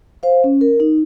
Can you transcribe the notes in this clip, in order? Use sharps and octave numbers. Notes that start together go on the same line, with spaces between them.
C5 F5
C#4
A#4
D#4